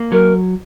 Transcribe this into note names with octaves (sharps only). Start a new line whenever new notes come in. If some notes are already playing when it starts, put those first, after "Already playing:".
Already playing: A#3
F#3 A#4